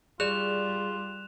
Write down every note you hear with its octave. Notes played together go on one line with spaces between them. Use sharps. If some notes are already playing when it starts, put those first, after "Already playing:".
G3 F4 G#4 D5 F#6 E7 F7